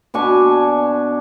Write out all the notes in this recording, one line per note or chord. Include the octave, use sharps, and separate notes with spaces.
B2 D4 G#5 C#6